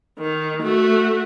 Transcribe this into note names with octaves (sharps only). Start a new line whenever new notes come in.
D#3
A3 F#4